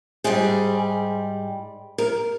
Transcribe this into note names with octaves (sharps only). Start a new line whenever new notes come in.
G#2 G3 G#4
A#4